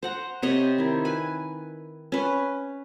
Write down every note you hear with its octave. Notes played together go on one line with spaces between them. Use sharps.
C5 F#5 A#5
C3 C#5 D#5 B5
D#3 E4
B4 G#5
C#4 B4